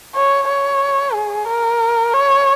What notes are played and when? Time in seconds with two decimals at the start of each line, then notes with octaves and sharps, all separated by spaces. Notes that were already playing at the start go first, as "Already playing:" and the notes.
0.15 C#5
0.48 C#5
1.14 G#4
1.48 A#4
2.14 C#5